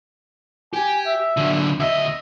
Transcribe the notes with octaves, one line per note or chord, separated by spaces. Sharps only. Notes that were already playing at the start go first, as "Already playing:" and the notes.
G4 G#5
E5
F#2 D3
D2 D#5 E5